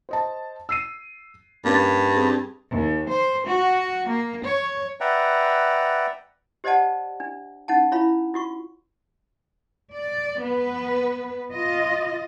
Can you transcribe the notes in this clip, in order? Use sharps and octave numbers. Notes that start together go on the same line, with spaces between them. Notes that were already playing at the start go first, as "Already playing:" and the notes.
C5 D#5 A5
E6 C7 D#7
G2 A#3 C#4
C4 G#4
D#2
C5
F#4
A#3
C#5
B4 D5 E5 F#5 G5 A#5
G4 C5 D5 D#5 F#5 A5
D4
C#4 D#4 F#5 A5
E4 F4 C#5 F5 B5
F4 F#4 C#6
D5
B3 B4
F4 D#5